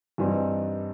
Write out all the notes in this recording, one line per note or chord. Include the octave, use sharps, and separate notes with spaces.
G2 E3 G3 C4 D#4